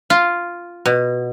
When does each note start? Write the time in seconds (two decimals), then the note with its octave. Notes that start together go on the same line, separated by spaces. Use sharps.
0.10 F4
0.86 B2